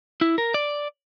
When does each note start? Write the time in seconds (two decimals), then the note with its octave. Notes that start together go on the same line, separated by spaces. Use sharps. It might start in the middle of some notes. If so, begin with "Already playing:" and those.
0.21 E4
0.38 A#4
0.54 D5